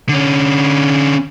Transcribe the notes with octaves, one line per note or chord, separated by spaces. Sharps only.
D3 C#4